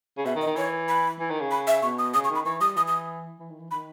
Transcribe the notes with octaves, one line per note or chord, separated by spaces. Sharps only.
C#3
B2 E5
D#3
D#5
D#3
E3 C#5
B5
E3
D#3
C#3
B5
E5
B2 C#6
D#6
C#3 D#6
C#6
D#3
B5
E3 C#6
G3 D#6
E3 D#6
D#6
E3
D#3
E3
D#3 B5